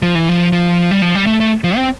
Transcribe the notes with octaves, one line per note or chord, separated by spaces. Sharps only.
F3
E3
F3
F3
G3
F3
G3
A3
A3
F3
C4